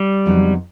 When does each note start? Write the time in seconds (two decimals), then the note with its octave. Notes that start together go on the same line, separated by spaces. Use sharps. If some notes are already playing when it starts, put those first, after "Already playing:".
Already playing: G3
0.26 F2 C#3 F#3 B3 D#4